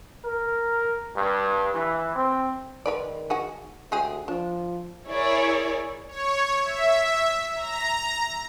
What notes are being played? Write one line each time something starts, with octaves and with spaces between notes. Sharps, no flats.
A#4
G2
E3
C4
D#3 G#3 B4 D5
D#4 F#4 G#4
D2 G#3 G4 G#4
F3 D4
E4 G#4 A#4 C#5 D5
C#5
E5
A#5